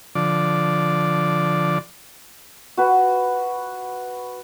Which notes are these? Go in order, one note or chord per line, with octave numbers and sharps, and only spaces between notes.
D3 F3 D5
F#4 B4